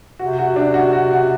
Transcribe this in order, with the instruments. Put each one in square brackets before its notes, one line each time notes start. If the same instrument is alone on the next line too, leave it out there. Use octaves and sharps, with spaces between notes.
[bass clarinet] C3 [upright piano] F#4
[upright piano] F#4
D4
F#4
F#4
F#4